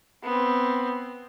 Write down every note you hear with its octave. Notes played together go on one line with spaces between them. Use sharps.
B3 C4